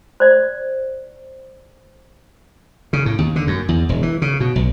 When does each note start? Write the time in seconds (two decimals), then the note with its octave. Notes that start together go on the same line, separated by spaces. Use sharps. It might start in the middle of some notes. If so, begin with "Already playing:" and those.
0.20 C5 D5
2.93 C#3
3.06 A2
3.18 D#2
3.36 D3
3.47 F#2
3.69 E2
3.89 E1
4.03 E3
4.22 C#3
4.40 B2
4.56 B1